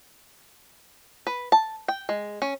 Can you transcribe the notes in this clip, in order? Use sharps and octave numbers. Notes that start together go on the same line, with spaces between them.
B4
A5
G5
G#3
C#4